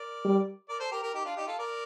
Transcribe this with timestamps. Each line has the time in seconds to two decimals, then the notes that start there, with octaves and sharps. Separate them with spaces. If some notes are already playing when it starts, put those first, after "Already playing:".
Already playing: A#4 D5
0.25 G3
0.69 A#4 D5
0.80 A4 C5
0.92 G4 A#4
1.03 G4 A#4
1.14 D#4 G4
1.24 D4 F4
1.37 D#4 G4
1.47 F4 A4
1.59 A#4 D5